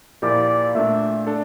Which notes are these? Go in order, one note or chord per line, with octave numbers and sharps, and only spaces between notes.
A#2 F3 A#3 E4 G4 D5
A#2 A3 D4 E5
D4 A4